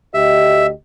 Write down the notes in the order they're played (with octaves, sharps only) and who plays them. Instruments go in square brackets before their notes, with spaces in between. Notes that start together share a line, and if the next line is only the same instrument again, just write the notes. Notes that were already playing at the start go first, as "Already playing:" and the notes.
[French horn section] D2 G4 D#5 [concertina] E5